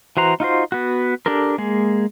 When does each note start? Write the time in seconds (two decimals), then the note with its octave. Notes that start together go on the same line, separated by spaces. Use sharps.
0.17 E3 F#4 C5 A#5
0.40 D#4 F4 F#4 C5
0.72 B3 F#4
1.26 D4 G4 A4 A#4
1.58 G#3 A#3 G#4